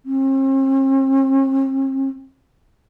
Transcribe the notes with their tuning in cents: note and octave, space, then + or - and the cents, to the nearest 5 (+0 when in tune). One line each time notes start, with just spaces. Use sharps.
C4 +45